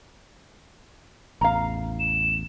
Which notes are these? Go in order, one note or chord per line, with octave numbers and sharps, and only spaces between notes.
A1 E2 F5 A#5
E7